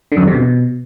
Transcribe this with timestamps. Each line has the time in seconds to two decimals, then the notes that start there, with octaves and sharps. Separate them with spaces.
0.12 D3
0.17 F#2
0.22 E2
0.27 C3
0.32 B2